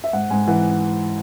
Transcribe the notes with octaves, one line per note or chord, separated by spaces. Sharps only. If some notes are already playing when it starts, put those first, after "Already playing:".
E5
G#2 F#5
G#2 G#5
E3 F#5